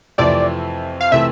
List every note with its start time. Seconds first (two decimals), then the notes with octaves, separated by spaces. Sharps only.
0.18 F2 C3 E3 A3 C4 D5
1.01 F5
1.12 C3 E3 A3 C4 E5